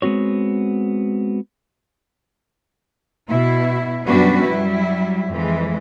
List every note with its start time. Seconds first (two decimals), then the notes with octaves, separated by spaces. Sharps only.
0.02 G#3 B3 C4 F#4 C#5
3.29 B2 E4
4.07 F#2 G3 B3 D4 F#4 B4
4.44 F#3 G3 E4
5.30 F2 E3 G#3